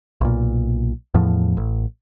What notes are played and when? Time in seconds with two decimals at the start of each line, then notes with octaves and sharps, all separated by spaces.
0.21 B1 A#2
1.14 E2 A2 F3
1.57 A1